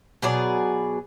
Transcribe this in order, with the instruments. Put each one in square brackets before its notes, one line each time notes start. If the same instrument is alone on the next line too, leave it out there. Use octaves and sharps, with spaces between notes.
[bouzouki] B2 F#3 G#4 D5